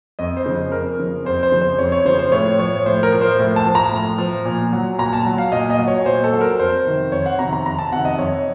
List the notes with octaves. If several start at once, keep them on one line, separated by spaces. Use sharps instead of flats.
F2 D#5
C5
C#3 F3
F2 A#4
C#3 F3
F2 C5
C5
C#3 F3
C5
F2 C#5
C#5
C#3 F3 C5
C5
A2 C#5
F3 C#5
A2 C5
A#4
F3
C5
A2
A5
F3
A#5
A2
F3
A#2
F#3
A#2 A#5
A5
F#3
F5
A#2 D#5
D#5
F#3
C#5
A#2 C5
A4
F#3
A#4
F2 C5
C3 D#3
F2 C#5
F#5
C3 D#3 A#5
A#5
F2 A#5
A5
C3 D#3 F#5
D#5
F2 C#5